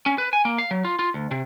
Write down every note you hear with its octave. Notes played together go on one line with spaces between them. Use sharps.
C#4
B4
G#5
A#3
F5
F#3
F4
F4
D2
C3